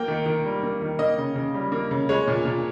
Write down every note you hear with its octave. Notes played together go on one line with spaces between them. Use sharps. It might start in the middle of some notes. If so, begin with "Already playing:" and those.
Already playing: A#3 G5
D#3
D#3
G3
A#3
D#3
A#3 D#5
C#3
C#3
G3
A#3
C#3
G#3 C#5
A#2
A#2